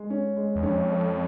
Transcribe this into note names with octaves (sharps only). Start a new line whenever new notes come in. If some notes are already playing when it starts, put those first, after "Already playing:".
Already playing: G#3
C#4
G#3
E2
F2 C#4
A4